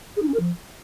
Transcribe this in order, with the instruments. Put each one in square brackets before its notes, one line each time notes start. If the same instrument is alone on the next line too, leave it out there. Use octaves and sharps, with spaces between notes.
[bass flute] G#4
D#4
C#4
A#4
F3